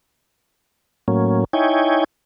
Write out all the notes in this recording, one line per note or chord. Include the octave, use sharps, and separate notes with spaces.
A2 F#3 A#3 C#4
D#4 E4 C#5 G5 G#5